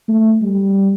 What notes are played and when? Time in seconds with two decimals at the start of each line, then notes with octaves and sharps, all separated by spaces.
0.09 A3
0.42 G3